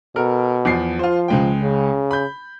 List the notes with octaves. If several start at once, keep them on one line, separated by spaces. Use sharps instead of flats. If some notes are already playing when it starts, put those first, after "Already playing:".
B2 A4 A#4 F6
E2 F3 C7
F3 F4 C5
C#2 G#3 G5
C#3
B5 G6